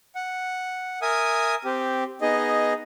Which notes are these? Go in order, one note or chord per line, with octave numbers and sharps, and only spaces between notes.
F#5
A#4 E5 G#5 D#6
C4 G4
B3 D#4 G#4 D#5